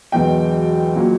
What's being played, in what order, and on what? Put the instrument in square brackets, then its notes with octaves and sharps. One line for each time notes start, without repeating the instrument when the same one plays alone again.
[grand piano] E1 E2 B2 F#3 G5
A#2 F#3